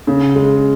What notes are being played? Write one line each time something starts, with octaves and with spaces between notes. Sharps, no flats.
C#3
G#3